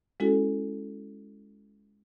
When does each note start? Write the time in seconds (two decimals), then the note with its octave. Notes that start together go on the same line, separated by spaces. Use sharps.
0.20 G#3 C#4 E4 F#4 A4